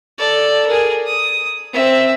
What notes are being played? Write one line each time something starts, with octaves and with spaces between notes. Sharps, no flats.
A4 D5
G#4 A#4
D#6
C4 E5